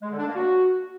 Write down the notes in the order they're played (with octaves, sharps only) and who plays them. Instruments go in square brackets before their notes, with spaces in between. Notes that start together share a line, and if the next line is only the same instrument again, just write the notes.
[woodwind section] G#3
D3
D4
A#3
F#4